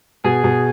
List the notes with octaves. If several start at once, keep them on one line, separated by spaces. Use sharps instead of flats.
B2 G#4
B2